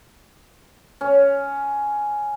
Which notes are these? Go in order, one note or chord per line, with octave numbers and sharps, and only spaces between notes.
C#4